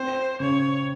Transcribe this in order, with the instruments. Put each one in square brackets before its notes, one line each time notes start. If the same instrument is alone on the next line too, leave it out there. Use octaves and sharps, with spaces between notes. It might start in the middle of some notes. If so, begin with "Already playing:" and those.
Already playing: [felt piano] C4 [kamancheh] C5
[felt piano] C#3 [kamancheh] C#5